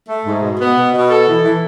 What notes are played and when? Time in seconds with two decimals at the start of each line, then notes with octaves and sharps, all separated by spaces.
0.08 A3
0.25 G#2
0.42 B2
0.60 B3
0.77 B2
0.94 B2
1.10 A4
1.28 E3
1.44 E3